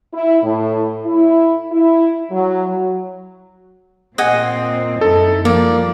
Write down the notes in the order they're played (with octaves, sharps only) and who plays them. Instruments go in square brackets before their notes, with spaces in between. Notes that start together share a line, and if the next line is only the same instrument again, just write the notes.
[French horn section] E4
A2
E4
E4
F#3
[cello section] A#2 A#3 C4 [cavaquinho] D#5 F#5 G#5
[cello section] F#2 D#4 E4 [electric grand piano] A4
[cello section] F3 G3 [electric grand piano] A#3 [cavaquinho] D5